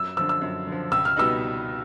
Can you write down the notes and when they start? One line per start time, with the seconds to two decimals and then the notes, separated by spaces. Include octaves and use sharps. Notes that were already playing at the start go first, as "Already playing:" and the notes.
Already playing: F#2 E6
0.17 D3 F3 E6
0.29 E6
0.42 F#2
0.67 D3 F3
0.92 C#2 E6
1.05 F6
1.17 B2 G3 B3 D#4 E6